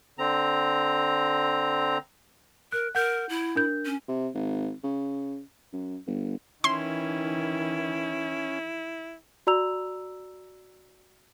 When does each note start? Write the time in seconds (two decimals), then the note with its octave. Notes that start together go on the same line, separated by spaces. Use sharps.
0.19 D3 C4 A#5
2.72 A#4 F#6
2.95 A#4 F#5 G6
3.29 E4
3.55 D4 A#4 G6
3.86 C#4
4.08 C3
4.34 G#1
4.84 C#3
5.73 F#2
6.07 G1
6.64 D#3 E3 C#4 E4 C6
9.47 F#4 D5 A#5 E6 F7